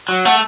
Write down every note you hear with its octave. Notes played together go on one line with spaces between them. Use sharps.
F#3
A3 F#5